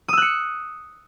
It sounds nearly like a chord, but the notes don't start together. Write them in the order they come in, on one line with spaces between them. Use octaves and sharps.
D#6 E6 F#6 C#7